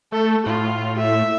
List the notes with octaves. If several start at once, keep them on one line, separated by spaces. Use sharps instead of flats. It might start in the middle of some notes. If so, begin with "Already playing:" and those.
A3 A4
A2 F4
E5